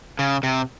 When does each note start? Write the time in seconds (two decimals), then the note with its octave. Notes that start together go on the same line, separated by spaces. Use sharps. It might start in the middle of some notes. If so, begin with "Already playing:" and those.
0.19 C#3
0.43 C3